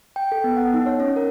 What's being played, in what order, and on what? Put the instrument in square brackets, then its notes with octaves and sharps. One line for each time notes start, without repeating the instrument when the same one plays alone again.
[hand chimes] G5
A4
B3
F#5
D#4
C#5
C#4
A#4